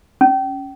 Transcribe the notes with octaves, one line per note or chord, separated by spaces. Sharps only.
C#4